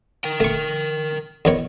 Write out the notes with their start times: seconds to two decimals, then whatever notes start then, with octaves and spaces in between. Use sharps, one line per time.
0.24 A#4 G5
0.40 A3 C#6
1.45 E2 D#3 C#5